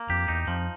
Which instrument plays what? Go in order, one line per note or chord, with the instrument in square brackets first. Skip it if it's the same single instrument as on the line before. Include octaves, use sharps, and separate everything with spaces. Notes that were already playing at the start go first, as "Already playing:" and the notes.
Already playing: [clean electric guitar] A#3
[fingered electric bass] F2 [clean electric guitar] G4
[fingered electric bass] E2 [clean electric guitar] D#4
[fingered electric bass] F2 [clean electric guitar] F3